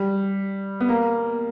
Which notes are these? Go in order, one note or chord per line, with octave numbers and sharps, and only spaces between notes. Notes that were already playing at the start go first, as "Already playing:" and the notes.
Already playing: G3
B3
A#3